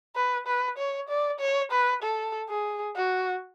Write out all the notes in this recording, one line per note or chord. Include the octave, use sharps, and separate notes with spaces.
B4
B4
C#5
D5
C#5
B4
A4
G#4
F#4